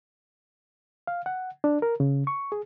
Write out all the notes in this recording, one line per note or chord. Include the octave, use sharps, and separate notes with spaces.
F5
F#5
D4
A#4
C#3
C#6
G#4